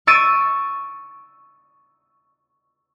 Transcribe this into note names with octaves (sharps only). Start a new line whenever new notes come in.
C#6 E6 A6 D7 D#7